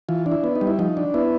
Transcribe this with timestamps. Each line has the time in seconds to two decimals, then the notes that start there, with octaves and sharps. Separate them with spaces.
0.09 E3 F4
0.26 D4
0.32 E4
0.44 B3
0.55 D#4
0.61 G3
0.67 E4
0.79 F3 D#4
0.97 D4
1.14 B3 E4